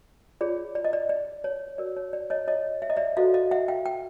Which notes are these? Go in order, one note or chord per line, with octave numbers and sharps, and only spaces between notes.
F4 G#4 C#5 D5
D5
D#5
D5
D5
C#5
F#4 A#4 C#5 D5
C#5
D5
C#5 D#5
C#5 D#5
E5
D#5
D5 E5
F#4 A4 C5 D#5 F5
D#5 F5
E5 F#5
F5 G5
G5